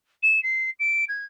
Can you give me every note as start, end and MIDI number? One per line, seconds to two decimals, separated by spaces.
0.23 0.42 100
0.43 0.70 96
0.79 1.05 98
1.08 1.25 92